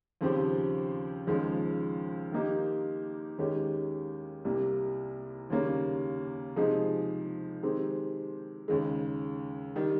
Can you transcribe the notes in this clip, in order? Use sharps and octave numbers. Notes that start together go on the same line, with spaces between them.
D#2 C#3 F3 C4 G4
D#2 C#3 F3 G#3
D#3 A#3 D#4 G4
D#2 D#3 G#3 C#4 G4
C2 C3 G3 A#3
D#2 C#3 G3 A#3 C#4
C3 F3 G#3 D#4 G#4
D#3 G#3 C4 G4
D#2 C#3 G#3
D#3 G3